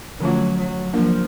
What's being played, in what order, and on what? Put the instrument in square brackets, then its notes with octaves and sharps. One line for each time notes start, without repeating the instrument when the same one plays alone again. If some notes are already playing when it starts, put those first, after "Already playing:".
[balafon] D3 F3 A3 C#4 F4 [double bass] F#3
[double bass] F#3
[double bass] F3 [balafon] F#3 A#3 D4 F4 A#4